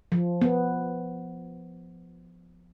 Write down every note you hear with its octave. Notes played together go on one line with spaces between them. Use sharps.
F3
B3